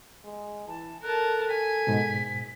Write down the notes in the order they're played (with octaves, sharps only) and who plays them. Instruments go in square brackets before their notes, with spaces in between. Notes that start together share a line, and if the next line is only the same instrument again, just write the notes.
[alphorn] G#3
[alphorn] E3 [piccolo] A5
[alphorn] A4 [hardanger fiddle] A#4 A5 [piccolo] F#6
[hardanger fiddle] G#5 [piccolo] B6
[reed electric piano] G#2 B2